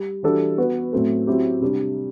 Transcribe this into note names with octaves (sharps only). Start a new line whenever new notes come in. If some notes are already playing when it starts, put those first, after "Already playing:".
Already playing: G3
E3 G3 D4 F#4 A4
B3 F#4 B4
A2 F#3 C4 E4 A4
F#3 C4 E4 G4
C3 G3 D4